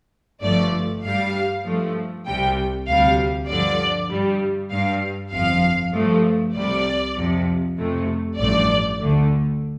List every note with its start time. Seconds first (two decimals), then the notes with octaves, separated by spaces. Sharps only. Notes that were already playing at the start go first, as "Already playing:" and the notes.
0.42 G1 G2 F3 A3 D5
1.04 G2 G3 F5
1.65 G2 F3 A3
2.26 C2 C3 G3 G5
2.88 D2 C3 G3 F5
3.48 G2 D3 F3 D5
4.10 G2 G3
4.71 G2 G3 F5
5.32 G1 F2 F3 F5
5.93 G2 F3 A3
6.55 C2 C3 G3 D5
7.16 F2 C3 F3
7.77 F2 C3 A3
8.38 A1 G2 F3 A3 D5
8.99 D2 D3 A3